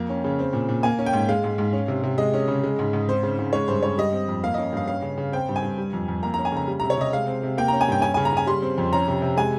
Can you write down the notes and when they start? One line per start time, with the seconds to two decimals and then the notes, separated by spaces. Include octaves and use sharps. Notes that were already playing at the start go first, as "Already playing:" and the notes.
Already playing: F2 A#3
0.09 C#4
0.24 C#3
0.39 C4
0.53 A#2
0.69 A#2
0.83 A#3 G#5
0.99 C#4
1.06 G5
1.13 G#2
1.29 G#3 F5
1.44 G#2
1.58 G#2
1.73 C#4
1.88 C3
2.03 C3
2.18 G#3 D#5
2.34 C#4
2.48 C#3
2.63 G#3
2.79 G#2
2.93 G#2
3.08 C4 C5
3.23 C#3
3.39 C#3
3.53 G#3 C#5
3.68 G2 C5
3.83 G2 C#5
3.98 G3 D#5
4.13 C4
4.28 F2
4.44 A#3 F5
4.54 C#4 D#5
4.73 G2 F5
4.87 C#4 F5
5.02 C#3
5.18 C#3
5.32 C4 G5
5.49 G2
5.56 G#5
5.62 G2
5.78 G3
5.93 F2
6.08 F2
6.23 A#3 A#5
6.34 C#4 A#5
6.45 G#5
6.52 C#3 A#5
6.68 G3
6.80 C3 A#5
6.90 C#5
6.97 C3 D#5
7.13 G#3 F5
7.27 C4
7.43 C3
7.58 A#3 G5
7.68 C#4 A#5
7.81 G#5
7.88 G2 G5
8.02 C#4 G#5
8.14 C#3 G#5
8.25 A#5
8.33 C#3 G#5
8.47 G3 C6
8.62 C4
8.78 F2
8.93 C#4 A#5
9.08 C3
9.22 C3
9.37 G#3 G#5